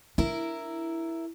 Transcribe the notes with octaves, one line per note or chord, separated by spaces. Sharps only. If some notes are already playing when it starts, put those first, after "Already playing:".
D4 E4 A#4